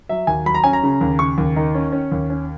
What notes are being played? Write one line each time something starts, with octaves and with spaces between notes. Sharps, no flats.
F#3 E5
D#2 G#5
F#3 B5
A#5
C#4 G#5
A#5
C#3
D#2
C#3 C#6
D#2
D#3
C#4
C#4
D#2
C#4